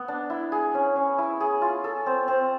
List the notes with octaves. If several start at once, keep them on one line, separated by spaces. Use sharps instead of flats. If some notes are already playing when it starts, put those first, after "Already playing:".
Already playing: B3
D4
E4
G#4
C#4
C#4
E4
G#4
F4
A4
C4
C4